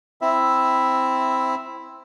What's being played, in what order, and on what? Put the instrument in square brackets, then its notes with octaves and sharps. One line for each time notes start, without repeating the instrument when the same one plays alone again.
[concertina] C4 E4 E5